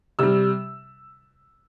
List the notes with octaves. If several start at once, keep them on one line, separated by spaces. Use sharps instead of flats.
C3 G3 E6